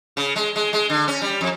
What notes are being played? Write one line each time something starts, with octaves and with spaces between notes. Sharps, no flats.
C#3
G#3
G#3
G#3
D3
C#4
G3
F2